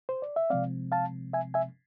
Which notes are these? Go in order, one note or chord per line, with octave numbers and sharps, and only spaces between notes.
C5
D5
E5
C3 F3 G#3 C4 D5 F5
F5 A5
E5 G#5
E5 G#5